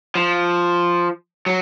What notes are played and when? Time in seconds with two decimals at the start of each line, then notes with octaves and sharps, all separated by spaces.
0.15 F3
1.46 F#3